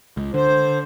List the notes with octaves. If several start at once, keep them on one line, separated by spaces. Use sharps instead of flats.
C#2
D3 C5